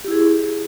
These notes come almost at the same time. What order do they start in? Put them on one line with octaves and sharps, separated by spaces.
G4 E4 G#4